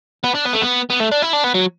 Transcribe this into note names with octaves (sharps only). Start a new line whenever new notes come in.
B3
D4
B3
A3
B3
B3
A3
D4
E4
D4
B3
F#3